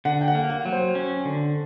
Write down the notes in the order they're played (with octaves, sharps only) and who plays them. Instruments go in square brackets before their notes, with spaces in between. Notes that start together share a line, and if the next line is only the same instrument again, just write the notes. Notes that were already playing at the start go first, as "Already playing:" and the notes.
[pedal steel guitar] D3 [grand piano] F#5
[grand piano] G5
F#5
[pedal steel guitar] A#3
[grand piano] F#5
[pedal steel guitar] F#3
[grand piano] C5
[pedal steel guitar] C#4
D3